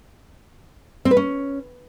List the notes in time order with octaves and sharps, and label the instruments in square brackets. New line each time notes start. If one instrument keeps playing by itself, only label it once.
[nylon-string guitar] C4
B4
C#4